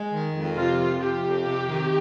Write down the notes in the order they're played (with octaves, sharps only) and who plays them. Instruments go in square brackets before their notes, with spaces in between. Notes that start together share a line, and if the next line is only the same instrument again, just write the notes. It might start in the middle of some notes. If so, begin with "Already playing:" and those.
Already playing: [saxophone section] G#3
D#3
F2
[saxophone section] C3 [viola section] F4
[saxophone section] F2
[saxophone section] C3 [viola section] G4
[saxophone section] F2
C3
D#3